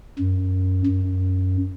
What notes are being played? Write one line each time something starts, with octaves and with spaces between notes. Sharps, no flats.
F#2
F#2